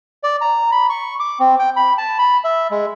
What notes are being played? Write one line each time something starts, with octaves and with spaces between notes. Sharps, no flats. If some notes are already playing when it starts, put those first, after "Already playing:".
D5
A#5
B5
C#6
D6
C4
G5
B5
A5
B5
E5
G#3